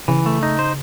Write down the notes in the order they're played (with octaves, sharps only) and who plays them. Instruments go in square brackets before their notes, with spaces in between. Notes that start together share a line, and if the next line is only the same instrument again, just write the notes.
[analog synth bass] C#3 [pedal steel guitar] E3
[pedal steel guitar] A3
D#4
C5